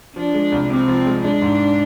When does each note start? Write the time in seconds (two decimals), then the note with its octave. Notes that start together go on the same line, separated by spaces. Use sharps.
0.16 F3 D4
0.34 G#3
0.52 C2
0.70 C3 C4
0.88 F3
1.06 G#3
1.24 G#3 D4
1.42 G#2